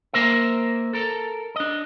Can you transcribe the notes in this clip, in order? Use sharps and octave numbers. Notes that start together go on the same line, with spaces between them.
A#3 A#4 C5 E5
A4 A#4
D4 D#5